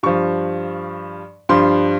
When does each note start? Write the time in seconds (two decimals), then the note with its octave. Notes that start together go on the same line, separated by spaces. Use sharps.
0.03 G2 F3 C#6
1.49 G2 F3 C6